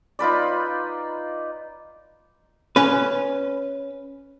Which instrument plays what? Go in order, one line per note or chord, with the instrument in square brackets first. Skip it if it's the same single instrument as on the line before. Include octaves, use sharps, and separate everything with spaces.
[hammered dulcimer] D#4 F4 B4 D5
[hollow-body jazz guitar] C#4 B4